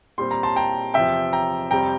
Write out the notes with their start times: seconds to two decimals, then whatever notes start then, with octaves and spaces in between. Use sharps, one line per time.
0.18 A#2 G3 C4 C6
0.31 A#5
0.43 A5 C6
0.56 G5 A#5
0.94 E2 C3 F3 E5 G5
1.33 G5 A#5
1.71 F2 C3 G3 C4 G5 A#5